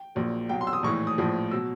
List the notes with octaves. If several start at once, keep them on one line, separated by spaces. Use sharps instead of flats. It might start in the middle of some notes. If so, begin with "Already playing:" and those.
Already playing: G5
A#1 A#2 F#3
C2 B2 F#3 G5
C6
E6
D#6
A#1 A2 E3 C#6
D#6
A#1 A2 F3
B2 F#3 E6